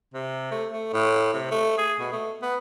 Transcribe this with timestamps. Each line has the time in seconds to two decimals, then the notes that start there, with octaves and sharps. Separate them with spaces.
0.14 C3
0.51 A3
0.72 A3
0.93 A2
1.34 C3
1.51 A3
1.78 G#4
2.00 B2
2.13 A3
2.42 B3